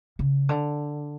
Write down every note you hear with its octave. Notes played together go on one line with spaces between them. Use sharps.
C#3
D3